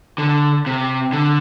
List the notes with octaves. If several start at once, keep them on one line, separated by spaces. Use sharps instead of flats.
D3
C3
D3